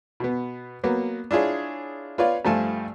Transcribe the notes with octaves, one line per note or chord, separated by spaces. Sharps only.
B2 B3
F#3 A#3 B3
D4 E4 F4 G#4 C#5
F4 B4 C#5 D5 F5
G2 F3 A3 F4 G#5 A5